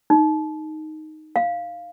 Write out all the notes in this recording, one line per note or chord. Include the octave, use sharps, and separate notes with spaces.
D#4
F5